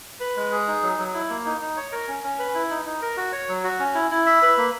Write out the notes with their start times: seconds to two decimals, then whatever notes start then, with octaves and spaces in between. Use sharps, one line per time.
0.20 B4
0.36 G#3
0.52 G#4
0.67 D#4
0.83 F#3
0.99 F#3
1.14 E4
1.30 A#3
1.45 D#4
1.61 D#4
1.77 C#5
1.92 A#4
2.08 C#4
2.24 C#4
2.39 B4
2.55 E4
2.70 D#4
2.86 D#4
3.02 A#4
3.17 F#4
3.32 C#5
3.48 F#3
3.64 F#4
3.79 C#4
3.95 E4
4.11 E4
4.26 E5
4.42 B4
4.57 A#3